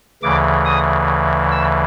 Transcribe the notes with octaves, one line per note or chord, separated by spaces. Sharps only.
D2 C#3 E3 D6
D#6
E6